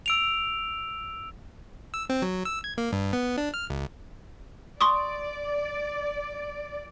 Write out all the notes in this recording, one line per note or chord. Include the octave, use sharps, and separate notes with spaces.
E6 D7 F7
E6
C4
F#3
E6
G#6
A#3
G2
B3
D4
F6
C#2
D5 C6 C#6 D#6